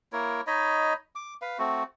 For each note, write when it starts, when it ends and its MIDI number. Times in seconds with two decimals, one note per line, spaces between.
0.12 0.41 58
0.12 0.41 64
0.12 0.41 70
0.12 0.41 73
0.47 0.93 63
0.47 0.93 73
0.47 0.93 75
0.47 0.93 83
1.15 1.34 86
1.42 1.58 71
1.42 1.58 77
1.59 1.83 57
1.59 1.83 60
1.59 1.83 66